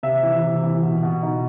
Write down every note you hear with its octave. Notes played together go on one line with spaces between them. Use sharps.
C3 E5
E3
C3
E3
B2
B2
D#4